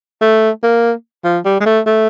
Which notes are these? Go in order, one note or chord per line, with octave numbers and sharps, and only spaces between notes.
A3
A#3
F3
G3
G#3
A3
A3